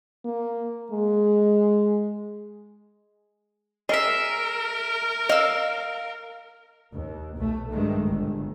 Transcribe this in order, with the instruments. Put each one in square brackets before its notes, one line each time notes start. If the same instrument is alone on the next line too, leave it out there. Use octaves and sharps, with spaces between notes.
[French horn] A#3
G#3
[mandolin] G#4 E5 [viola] A#4 [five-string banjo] D#5
[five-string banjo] D#5 [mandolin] F5 E6
[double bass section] D#2
B1 B2 A3
G2 D#3 G#3 A3
G1 A#2